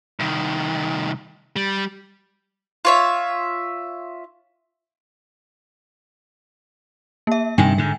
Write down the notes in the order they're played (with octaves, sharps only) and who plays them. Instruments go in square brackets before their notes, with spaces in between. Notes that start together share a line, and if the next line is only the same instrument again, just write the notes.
[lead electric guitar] C2 D#3
G3
[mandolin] F4 C#5 E5
[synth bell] A#3 E5
[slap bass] G2 C3 D#3 [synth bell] G5 G#5
[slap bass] G#2 D3